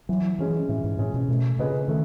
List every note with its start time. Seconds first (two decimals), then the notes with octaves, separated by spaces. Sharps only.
0.09 E3 F#3
0.39 E3 G#3 C#4 G#4
0.69 A2 E3
0.84 G#2
0.99 A2 G#3 C#4 G#4
1.14 B2
1.29 B2 A3
1.59 C#3 C#4 G#4 B4 D#5
1.88 D#3 A3